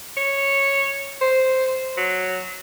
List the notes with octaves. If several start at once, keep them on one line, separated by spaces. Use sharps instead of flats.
C#5
C5
F#3